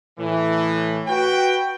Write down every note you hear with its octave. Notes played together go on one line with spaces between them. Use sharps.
A2 E3
F#4 B4 G5